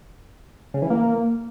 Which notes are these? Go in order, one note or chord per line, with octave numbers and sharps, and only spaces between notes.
C#3
E3
A#3